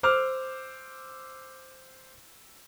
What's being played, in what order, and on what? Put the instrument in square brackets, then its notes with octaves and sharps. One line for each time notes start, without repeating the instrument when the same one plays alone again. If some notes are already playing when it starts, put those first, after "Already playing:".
[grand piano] C5 D6 E6 F6